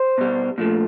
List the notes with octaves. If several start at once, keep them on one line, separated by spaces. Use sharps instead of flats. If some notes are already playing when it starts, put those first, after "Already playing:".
Already playing: C5
B2 G3
A#2 F3 A3